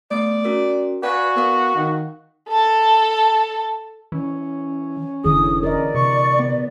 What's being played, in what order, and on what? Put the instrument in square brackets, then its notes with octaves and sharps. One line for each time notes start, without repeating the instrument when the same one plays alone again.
[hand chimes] A3 B3 [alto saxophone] D5
[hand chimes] C#4 F#4 A#4
[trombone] F#4 [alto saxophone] B4 [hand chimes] D5 F5 G#5
[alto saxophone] B3 [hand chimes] A#4 F5
[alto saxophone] D#3
[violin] A4 A5
[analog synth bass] E3 [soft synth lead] C#4
[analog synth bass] F1 [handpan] D3 E3 G#4 [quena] D#6
[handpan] A#4 D#5 [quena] D5
[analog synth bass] C3 [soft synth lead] C#6
[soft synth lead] B3